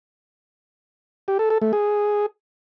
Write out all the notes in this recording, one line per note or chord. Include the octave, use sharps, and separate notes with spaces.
G4
A4
A4
A3
G#4